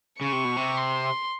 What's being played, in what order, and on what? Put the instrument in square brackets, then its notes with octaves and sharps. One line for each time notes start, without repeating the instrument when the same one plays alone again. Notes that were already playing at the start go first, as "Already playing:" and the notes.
[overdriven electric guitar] C#3 [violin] C#6
[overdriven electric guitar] C3
B2
C3
[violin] C6